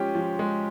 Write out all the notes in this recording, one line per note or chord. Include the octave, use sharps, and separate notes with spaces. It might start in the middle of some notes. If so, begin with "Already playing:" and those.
Already playing: F3 G#3 C#4 G4
F3
G#3